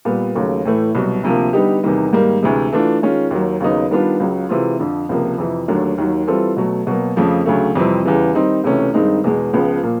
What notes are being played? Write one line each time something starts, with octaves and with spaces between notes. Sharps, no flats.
A#2 G3 B3
D#2 C#3 F#3 A3
A2 E3 A3
C2 B2 F#3
D2 C3 F3 A#3
D3 G3 B3 D#4 G4
E2 C3 D#3 G3
G#2 D#3 G3 A#3
D2 C3 E3 G#3
E3 A3 D4 F4
D#3 G#3 C#4 F4
D#2 D#3 F#3
D#2 C#3 F#3 B3 D#4
D#3 G3 B3 D4 F4
C#2 C#3 F#3
C3 E3 G#3 C4 F4
F2 D3 F3
C#2 C3 F3 A#3
F2 C3 E3
D#2 D3 F#3 A3 D4
D#2 D#3 F#3
E3 G3 C4 F4 A4
B2 F#3 A3
B2 F#3 A#3
F2 C#3 F3 A3
D2 C#3 F#3 A3
F2 C3 E3 G3 C4
E2 C#3 E3 G3
D#3 G3 C4 D#4
C#2 C3 E3 A3 C#4
G2 D#3 G#3 C4 D#4
E2 B2 G#3
C#2 C#3 F3 G#3 B3
A#2 F3 A#3